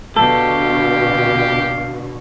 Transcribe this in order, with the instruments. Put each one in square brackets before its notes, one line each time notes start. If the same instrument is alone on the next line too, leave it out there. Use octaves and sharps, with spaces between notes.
[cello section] B2 D3 [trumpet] G4 [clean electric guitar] A4 [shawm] F5